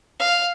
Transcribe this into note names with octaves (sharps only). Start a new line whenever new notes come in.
F5